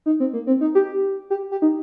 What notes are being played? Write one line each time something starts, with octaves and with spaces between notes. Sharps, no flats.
D#4
C4
A#3
C4
D#4
G4
G4
G4
D#4